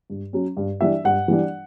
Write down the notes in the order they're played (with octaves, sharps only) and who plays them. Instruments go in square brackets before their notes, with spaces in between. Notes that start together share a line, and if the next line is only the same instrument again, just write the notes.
[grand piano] G2
F#3 C#4
G2
E3 G3 D4 E5
G2 F#5
E3 G3 D4